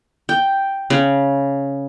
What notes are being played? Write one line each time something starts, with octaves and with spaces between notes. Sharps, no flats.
G5
C#3